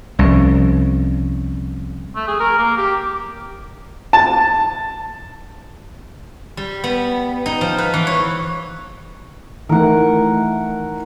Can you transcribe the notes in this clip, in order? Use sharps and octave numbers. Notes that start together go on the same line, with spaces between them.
C2 F3 C#4
A3
G#4
A#4
A#3
G4
A5
G3
B3
D#4
F3
B4
E3
C#5
D#3 E3 A3 A#4 F#5